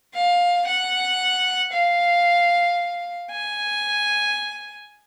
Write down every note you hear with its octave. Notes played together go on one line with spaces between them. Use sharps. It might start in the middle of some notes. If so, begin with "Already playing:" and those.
F5
F#5
F5
G#5